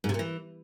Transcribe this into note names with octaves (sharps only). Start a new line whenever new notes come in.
G#2
C3
A#2
E3